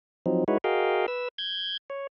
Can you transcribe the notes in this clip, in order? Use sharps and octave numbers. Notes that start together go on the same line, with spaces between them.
F3 F#3 C4 D#4
G#3 D#4 E4 F#4 B4 C#5
F#4 G#4 A#4 D#5 F5 G5
B4 E6
G6 G#6
C#5